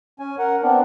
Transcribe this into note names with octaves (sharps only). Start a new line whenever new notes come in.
C#4 G#5
A#4 F#5
B3 C4 D4